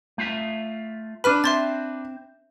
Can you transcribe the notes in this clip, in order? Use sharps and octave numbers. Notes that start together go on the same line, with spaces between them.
A3 F4 E5
D4 B4 B5 F6 D#7
C4 E5 C6 A6